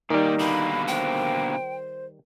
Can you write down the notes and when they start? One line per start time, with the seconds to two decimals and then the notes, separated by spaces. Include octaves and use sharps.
0.10 D#3 G3 A#3 D#4 D5
0.40 B2 D3 A#3 B5
0.88 C5 G5